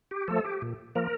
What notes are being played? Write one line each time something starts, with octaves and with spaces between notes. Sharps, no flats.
G4
F3 A3 A4
G4
A#2
F3 A#3 A#4